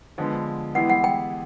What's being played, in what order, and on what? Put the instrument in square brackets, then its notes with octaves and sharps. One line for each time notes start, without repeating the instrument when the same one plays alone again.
[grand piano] D3 F3 G#3 B3
[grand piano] E3 G#3 B3 E4 G4 [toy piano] F#5
[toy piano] F#5
G5